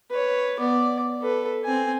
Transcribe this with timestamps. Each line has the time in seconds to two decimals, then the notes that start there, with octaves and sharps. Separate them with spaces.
0.10 B4 C#5
0.59 B3 D5
1.22 A4 B4
1.65 C4 G#5